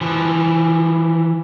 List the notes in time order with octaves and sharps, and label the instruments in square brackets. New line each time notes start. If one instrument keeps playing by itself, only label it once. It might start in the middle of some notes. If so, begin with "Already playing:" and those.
[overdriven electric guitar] E3 F3